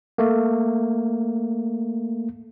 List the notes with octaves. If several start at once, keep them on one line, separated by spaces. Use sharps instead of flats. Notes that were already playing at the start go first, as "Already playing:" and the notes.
A3 A#3